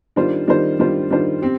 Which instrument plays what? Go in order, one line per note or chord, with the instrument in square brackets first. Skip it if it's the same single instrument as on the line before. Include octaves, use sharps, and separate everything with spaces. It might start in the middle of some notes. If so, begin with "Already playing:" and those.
[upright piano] D#3 G3 D4 F4 C5
D#3 G3 D4 F4 C5
D#3 G3 D4 F4 C5
D#3 G3 D4 F4 C5
C4 G4